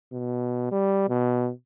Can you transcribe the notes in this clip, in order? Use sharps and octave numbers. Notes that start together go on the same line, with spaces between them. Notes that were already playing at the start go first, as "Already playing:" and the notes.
B2
G3
B2